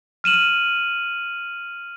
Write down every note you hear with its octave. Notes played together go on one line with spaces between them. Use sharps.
F6 D#7 E7 F#7